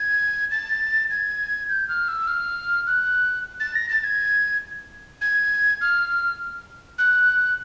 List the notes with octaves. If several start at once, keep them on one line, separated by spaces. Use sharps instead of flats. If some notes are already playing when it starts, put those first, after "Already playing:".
Already playing: G#6
A6
G#6
G6
F6
E6
F6
F#6
A6
A#6
A6
G#6
G#6
F6
F#6